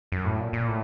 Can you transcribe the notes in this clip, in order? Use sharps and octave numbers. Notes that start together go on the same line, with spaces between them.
F#2
A2
A#2
A#2
A2